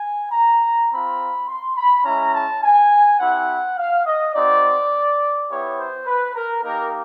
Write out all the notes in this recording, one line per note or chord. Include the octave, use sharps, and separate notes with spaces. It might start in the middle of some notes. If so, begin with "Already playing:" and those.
Already playing: G#5
A#5
C4 F4 B5
C6
B5
G#3 C#4 E4 A#5
A5
G#5
C4 E4 G4 F#5
F5
D#5
C4 D#4 F#4 D5
B3 E4 G4 C#5
C5
B4
A#4
A#3 D#4 G4 A#4